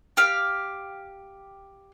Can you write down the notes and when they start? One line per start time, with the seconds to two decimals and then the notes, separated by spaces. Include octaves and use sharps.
0.17 G4 F5